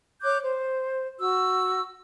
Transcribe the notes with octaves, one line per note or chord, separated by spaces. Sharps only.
C#5 D6 F#6 G6
C5
F#4 E6